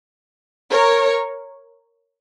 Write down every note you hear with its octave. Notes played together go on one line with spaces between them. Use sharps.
A#4 C#5